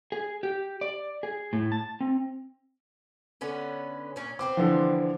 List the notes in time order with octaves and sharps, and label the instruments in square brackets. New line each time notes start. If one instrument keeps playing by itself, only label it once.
[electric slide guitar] G#4
G4
D5
G#4
A2
A5
C4
[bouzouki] D3 B3 C#4
A#2 C#4
[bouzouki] B3 C4 C5 [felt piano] D6
[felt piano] D3 E3 F3